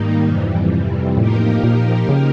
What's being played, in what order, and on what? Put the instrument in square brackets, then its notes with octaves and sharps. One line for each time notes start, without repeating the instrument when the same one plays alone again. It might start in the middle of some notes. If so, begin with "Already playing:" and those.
Already playing: [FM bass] G#2 [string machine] D#3 G3 A#3 D#4
[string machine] F2 C3 E3 G3
[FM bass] A2 [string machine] F3 A#3 D#4 G4 A#4
[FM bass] A#2
C#3